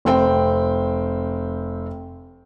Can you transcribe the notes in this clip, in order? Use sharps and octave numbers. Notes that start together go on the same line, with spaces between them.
F1 C4 G5